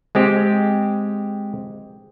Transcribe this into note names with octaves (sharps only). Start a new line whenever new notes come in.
G#3 C4 G4